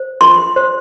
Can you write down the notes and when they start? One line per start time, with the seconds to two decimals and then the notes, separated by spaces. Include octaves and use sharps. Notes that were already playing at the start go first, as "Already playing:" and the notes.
Already playing: C5
0.21 F4 C6
0.56 C5